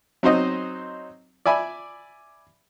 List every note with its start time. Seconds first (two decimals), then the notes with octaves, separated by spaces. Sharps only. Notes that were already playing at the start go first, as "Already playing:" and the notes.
0.23 F#3 C4 D#4 C5 D#5
1.46 D5 E5 G#5 B5